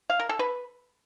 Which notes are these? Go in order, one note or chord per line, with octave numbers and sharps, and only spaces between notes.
F5
A#4
A4
B4